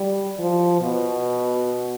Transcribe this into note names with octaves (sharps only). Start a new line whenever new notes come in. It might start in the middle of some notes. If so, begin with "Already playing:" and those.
Already playing: G3
F3
B2